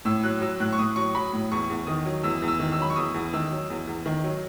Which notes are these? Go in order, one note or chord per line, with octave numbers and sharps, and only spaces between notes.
A2 E6
F#3 F#6
F#3 E6
A2 F#6
C#6
A2 D#6
F#3 C#6
F#3 B5
A2
E2 C#6
E2
D#3 D#6
F#3
E2 E6
E2
E6
D#3
E6
F#3 B5
C#6
E2 D#6
E2
D#3 E6
F#3
E2
E2
D#3
F#3